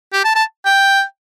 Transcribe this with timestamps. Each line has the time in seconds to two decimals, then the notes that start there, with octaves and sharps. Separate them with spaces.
0.13 G4
0.25 A5
0.35 A5
0.66 G5